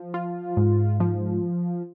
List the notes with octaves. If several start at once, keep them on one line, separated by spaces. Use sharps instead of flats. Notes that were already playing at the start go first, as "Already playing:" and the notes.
Already playing: F3
F4
G#2
F3